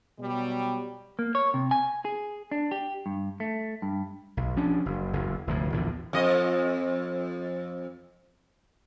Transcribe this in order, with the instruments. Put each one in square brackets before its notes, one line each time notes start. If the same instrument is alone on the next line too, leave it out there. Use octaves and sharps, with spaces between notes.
[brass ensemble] B2 F#3 G3
[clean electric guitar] A#3
C#5
C3
G#5
G#4
D4
G4
G2
A3
G2
[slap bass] B1
F3 C#4 D4
F#1
F#1 E2
F1 D2 A2
A#1 E2 A2 D3
[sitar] F2 D#5